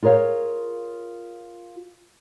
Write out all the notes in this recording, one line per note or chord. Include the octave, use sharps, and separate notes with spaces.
F4 G#4 A#4 C#5 F5